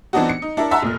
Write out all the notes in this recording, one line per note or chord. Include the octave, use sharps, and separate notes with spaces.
E3 B3 C4 D4 D#4 F#4
C#7
D#4
D4 E4 A#4
E5 F#5 A5 A#5 C6 E6
F1 A#2 F6